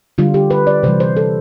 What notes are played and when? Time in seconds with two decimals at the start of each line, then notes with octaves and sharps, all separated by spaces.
0.18 D3 G3 F4
0.34 G4
0.51 B4
0.67 D5
0.83 C3 E3 G3 C5
1.00 C5
1.17 A4